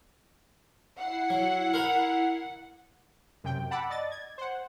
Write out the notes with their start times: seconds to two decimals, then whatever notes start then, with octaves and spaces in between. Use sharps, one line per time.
0.98 E4 F#5 C7
1.30 F#3
1.74 A#4 A#5 B5
3.44 F#2 C3 G5
3.71 F#5 A5 B5 D6 E6
3.90 D5 D#5 A6
4.11 G#6
4.38 C5 F#5